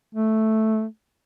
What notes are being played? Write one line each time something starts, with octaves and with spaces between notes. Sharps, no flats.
A3